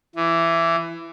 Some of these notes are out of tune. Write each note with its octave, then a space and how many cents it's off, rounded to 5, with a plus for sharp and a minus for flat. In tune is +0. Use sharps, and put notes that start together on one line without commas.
E3 +15